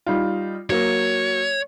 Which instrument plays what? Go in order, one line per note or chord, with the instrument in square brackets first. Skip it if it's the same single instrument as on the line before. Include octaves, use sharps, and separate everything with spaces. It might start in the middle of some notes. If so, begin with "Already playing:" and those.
[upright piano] G3 D#4 F4
[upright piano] F#3 A#3 [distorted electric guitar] C#5